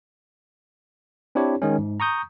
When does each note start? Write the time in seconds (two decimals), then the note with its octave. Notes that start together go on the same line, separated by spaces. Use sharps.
1.35 C4 D4 E4 G4 C#5
1.62 D#3 G#3 C#4
1.78 G#2
2.00 A#5 C#6 D#6 G6